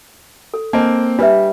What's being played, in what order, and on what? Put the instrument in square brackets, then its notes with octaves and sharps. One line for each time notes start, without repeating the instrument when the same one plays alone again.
[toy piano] A4
[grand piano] A#3 C4 [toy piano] D4 D#5 A5
[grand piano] G3 [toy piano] D4 B4 E5